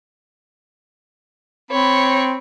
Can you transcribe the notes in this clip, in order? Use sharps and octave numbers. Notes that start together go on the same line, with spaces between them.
C4 C#5 B5